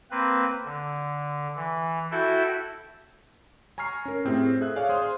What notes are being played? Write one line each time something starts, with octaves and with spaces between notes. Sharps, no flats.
A#3 C4 B4
D3
E3
E4 F#4 A4 E5 G5
G#5 A#5 C#6 F6 C7
C#4 A#4
A2 C4 G4 G#4 E5
G#4 A4 E5 F#6
G#4 C#5 D5 F5 G#5
G#4 C5 F5 C6 D#6